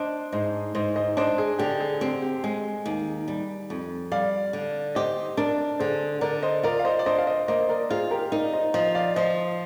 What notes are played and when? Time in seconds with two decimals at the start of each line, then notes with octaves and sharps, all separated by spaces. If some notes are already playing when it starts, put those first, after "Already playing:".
Already playing: D4 C5 D#5
0.32 G#2 C5 D#5
0.75 G#2 C5 D#5
0.96 C5 D#5
1.17 D4 C5 D#5
1.38 G#4
1.59 D3 G4
1.80 G#4
2.01 C4 G4
2.22 G4
2.44 G#3 G#4
2.86 D#2
3.28 G3
3.70 F2
4.12 G3 D5 F5
4.53 D3
4.95 G4 C5 D#5
5.37 D4 A#4 D5
5.79 D3 G#4 C5
6.21 D3 A#4 D5
6.43 C5 D#5
6.63 F4 A#4 D5
6.79 F5
6.85 C5 D#5
6.99 D5
7.06 D4 C5 D#5
7.18 F5
7.27 C5 D#5
7.48 A#3 C5 D#5
7.69 A#4 D5
7.90 F4 G#4 C5
8.11 G4 A#4
8.32 D#4 A#4 D5
8.53 C5 D#5
8.74 F3 C5 D#5
8.95 D5 F5
9.16 F3 C5 D#5